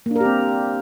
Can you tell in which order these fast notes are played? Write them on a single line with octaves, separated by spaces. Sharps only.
A#3 D4 A#4 G4 C4